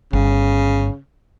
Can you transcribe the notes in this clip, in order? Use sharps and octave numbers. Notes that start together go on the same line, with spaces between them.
G1 C#3